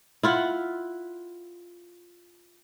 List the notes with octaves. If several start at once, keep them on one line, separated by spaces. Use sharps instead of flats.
E4 F4 F#5